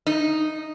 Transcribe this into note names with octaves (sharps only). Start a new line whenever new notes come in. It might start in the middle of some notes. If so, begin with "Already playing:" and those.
D#4